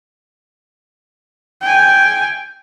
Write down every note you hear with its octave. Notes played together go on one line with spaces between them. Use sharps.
G5 G#5